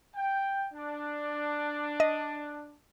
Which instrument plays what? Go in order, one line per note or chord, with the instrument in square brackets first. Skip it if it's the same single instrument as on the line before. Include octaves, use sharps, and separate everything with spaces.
[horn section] G5
D4
[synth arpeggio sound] D#5